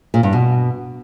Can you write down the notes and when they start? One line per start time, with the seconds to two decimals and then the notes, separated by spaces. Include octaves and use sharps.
0.14 A#2
0.23 G2
0.33 B2